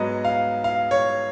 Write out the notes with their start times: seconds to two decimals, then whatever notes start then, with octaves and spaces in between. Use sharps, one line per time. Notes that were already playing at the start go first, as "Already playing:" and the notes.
Already playing: G#2 F#3 B3 D#5
0.25 F5
0.64 F5
0.91 C#5